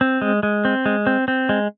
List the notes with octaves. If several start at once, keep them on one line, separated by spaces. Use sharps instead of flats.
C4
G#3
G#3
C4
G#3
C4
C4
G#3